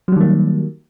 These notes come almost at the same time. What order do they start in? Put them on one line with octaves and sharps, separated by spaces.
F#3 G3 D#3 A#3